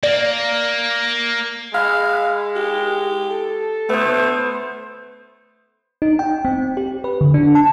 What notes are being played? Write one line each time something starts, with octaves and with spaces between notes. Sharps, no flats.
A#3 D5
G#3 F5 B5
G4
A4
A3 B3 C5
D#4
G5
C4
G4
B4
D3
D4
A5